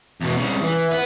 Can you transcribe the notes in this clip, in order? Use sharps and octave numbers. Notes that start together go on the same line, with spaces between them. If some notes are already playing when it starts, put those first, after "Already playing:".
E2 B2
C2 C#3
E3
B4 F#5